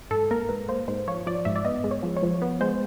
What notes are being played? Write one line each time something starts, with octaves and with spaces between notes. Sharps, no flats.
G#2 A4
A#3 A#4
G#2 B4
A#3 C5
G#2 C5
F3 C#5
F3 D5
G#2 E5
D5
B3 D#5
G#3
C#5
F3
C#5
F3
B3
G#3 C5